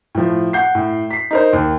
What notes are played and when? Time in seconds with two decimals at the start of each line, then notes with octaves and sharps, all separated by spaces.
0.15 A2 F3
0.53 F#5 G6 C7
0.75 A2
1.10 B6 C7
1.31 D#4 A#4 C5
1.53 D#2